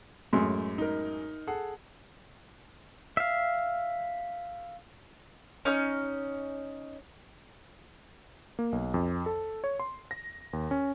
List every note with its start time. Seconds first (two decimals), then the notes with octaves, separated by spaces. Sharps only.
0.33 F#2 A2 G#3 C6
0.78 D#4 A#4
1.47 G#4 A4 F#5
3.17 E5 F5
5.65 C#4 D#4 F6
8.59 A#3
8.72 B1
8.94 F2
9.26 A4
9.64 C#5
9.80 C6
10.11 A#6
10.53 D#2
10.71 C#4